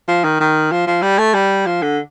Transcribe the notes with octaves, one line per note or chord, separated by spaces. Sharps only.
F3
D#3
D#3
F3
F3
G3
A3
G3
F3
D3